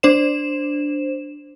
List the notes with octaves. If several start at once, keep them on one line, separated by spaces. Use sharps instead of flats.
D4 C5 E7